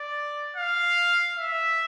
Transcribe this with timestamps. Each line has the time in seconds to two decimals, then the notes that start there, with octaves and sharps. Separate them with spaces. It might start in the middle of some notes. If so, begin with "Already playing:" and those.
Already playing: D5
0.57 F5
1.36 E5